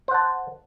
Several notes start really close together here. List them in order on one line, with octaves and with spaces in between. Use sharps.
C5 F#5 A5